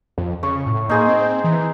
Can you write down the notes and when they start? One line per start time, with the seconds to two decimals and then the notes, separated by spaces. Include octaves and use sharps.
0.18 F2
0.43 C#3 C#6
0.66 A2
0.89 A#3 D#4 G#4 C5
1.08 C4
1.44 E3